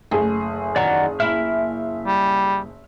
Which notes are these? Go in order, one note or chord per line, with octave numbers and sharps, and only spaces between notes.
F#1 A3 G#4
E2 D#3 F#3 D5 F#5 A#5
A#3 E4 E5 F6
G3